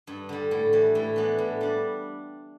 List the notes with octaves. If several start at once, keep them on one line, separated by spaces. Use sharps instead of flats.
G2
D3 G3
A2
E3 G3
A2
E3 B3 D4
A2
G3 D4